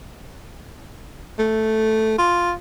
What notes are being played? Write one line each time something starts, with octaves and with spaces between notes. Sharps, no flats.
A3
F4